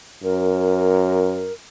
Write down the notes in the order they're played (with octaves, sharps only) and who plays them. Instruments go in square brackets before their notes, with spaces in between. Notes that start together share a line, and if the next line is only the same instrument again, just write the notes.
[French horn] F#2 [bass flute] A#4